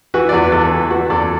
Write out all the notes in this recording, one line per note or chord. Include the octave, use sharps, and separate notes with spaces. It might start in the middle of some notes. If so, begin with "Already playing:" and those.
E3 F#4 B4
D5
E2 F#4 B4
B4
E2 A4 D5
E3
E3 F#4 B4
E2 A4 D5